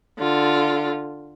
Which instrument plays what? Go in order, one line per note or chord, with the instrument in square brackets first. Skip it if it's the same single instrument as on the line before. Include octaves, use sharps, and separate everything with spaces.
[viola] D3 F4